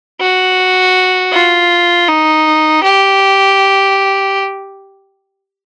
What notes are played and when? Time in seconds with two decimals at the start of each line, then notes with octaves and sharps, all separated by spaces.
0.20 F#4
1.33 F4
2.08 D#4
2.83 G4